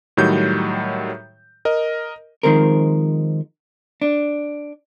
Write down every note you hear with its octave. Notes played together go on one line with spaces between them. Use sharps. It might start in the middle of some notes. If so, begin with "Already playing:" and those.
A2 D#3 F#3 G3 G6
A#4 D#5
D#3 F3 G#3 C4 A#4
D4